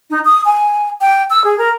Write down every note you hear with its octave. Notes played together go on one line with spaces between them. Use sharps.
D#4
D#6
G#5
G5
E6
G#4
A#4